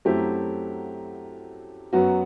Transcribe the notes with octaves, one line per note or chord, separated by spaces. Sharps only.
F#2 F#3 A3 C4 E4 G4
F#2 F#3 B3 F#4